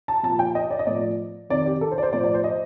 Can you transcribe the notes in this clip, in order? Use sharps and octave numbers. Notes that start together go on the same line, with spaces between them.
A5
A#2 F3 A5
G5
D#5
D5
D#5
A2 F3 D5
F2 C3 D#3 D5
G4
A4
C5
D5
C5
A2 F3 D5
D5
C5
D#5